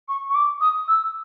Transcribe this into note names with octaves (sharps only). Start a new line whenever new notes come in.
C#6
C#6
D6
D#6
E6